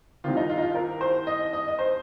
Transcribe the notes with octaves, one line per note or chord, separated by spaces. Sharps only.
C2 C3 D#3 F4
D#4
F4
D#4
F4
A#4
C5
D#5
D#5
D#5
C5